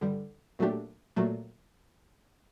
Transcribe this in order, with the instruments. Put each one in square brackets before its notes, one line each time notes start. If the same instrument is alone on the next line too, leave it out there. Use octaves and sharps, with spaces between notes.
[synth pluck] G2 D3 G3
A#2 F#3 A3 D4 G4
A#2 F#3 A3